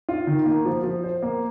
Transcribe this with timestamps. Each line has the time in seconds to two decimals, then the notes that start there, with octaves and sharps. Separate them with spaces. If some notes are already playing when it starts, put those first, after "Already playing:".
0.09 F4
0.27 D#3
0.46 A#3
0.65 F3
0.84 F3
1.03 C5
1.23 A#3